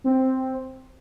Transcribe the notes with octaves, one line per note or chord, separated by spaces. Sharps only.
C4